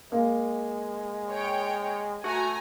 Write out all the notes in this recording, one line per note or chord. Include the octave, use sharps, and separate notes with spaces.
G#3 A#3
C#5 G5
A3 F#4 G#5 A#5